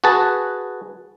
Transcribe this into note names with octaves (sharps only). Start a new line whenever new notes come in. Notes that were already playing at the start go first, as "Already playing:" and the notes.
F#4 G#4 B4 A5